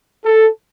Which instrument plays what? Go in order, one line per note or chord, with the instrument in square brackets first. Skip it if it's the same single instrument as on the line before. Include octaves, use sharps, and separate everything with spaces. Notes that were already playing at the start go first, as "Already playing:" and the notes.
[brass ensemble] A4